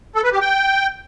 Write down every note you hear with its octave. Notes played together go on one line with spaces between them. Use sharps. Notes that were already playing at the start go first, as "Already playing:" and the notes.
A4
B4
G4
G5